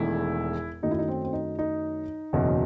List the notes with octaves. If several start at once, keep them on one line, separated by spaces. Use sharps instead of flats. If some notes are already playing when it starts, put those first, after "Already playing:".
Already playing: E1 E2 D#3 A3 E4
F#2 D#3 F#3 A3 D#4
E4
D#4
C4
C4
D#4
D#4
F#1 E2 B2 F#3